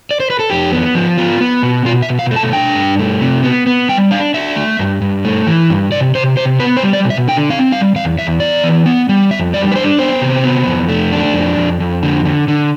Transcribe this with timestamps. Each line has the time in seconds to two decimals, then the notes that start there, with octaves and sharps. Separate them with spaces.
0.11 D5
0.20 C5
0.30 B4
0.39 A4
0.50 F2 G4
0.73 B3
0.95 F3
1.18 B3 F4
1.41 B3
1.63 B2
1.85 B2 F4
2.02 E5
2.09 B2
2.19 F5
2.31 A3
2.36 A5
2.53 D4 G5
2.75 G2
2.99 A3
3.21 C3
3.44 B3
3.67 B3
3.89 G3 G5
4.11 D4 F5
4.34 D4 E5
4.56 A3
4.79 G2
5.02 G2
5.25 A3
5.47 E3
5.70 G2
5.92 C3 D5
6.15 C3 C5
6.37 C3 C5
6.60 B3 B4
6.77 C5
6.83 G3
6.93 D5
7.05 B2
7.10 E5
7.28 D3 G5
7.50 C4 F5
7.72 G3 F5
7.96 E2 F5
8.19 E2 E5
8.40 B3 D5
8.64 E3
8.86 B3
9.09 G3
9.31 F2 E5
9.54 G3 D5
9.72 B4
9.76 D4 C5
9.99 B3 C5
10.22 C3
10.44 B3
10.66 F2
10.89 A3
11.12 D4
11.34 F2
11.57 F2
11.80 F2
12.03 D3
12.25 D3
12.48 D3